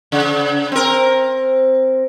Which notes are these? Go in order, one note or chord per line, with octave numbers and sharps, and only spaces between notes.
C#3
C4 A#4